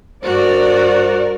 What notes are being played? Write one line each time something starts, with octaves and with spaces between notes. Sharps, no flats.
G2 F#4 A#4 C5 D5